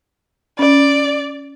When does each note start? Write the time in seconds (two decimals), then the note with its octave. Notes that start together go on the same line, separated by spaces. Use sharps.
0.59 C#4 D5